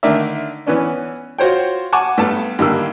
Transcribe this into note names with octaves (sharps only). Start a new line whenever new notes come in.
D3 D#3 A3 A#4 D5 E5
E3 B3 C#4 D4
F4 F#4 C5 C#5 G5
F#5 G#5 A5 C#6 D6
G2 A3 B3 A4 A5
G2 D3 D#3 G3 A#3 E6